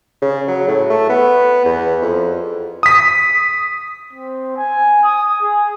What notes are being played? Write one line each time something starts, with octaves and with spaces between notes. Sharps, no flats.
C#3
F#3
A2
A3
B3
E2
F2
D#6 B6
C4
G#5
D#6
G#4